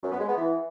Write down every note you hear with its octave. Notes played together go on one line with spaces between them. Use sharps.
F#2
B3
G#3
B3
E3